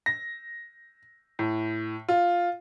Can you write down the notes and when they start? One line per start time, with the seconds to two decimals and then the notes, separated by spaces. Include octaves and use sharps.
0.06 A#6
1.39 A2
2.09 F4